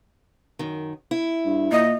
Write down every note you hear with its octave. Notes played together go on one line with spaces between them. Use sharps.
F#2 D#3
E4
G2
A#2 D#5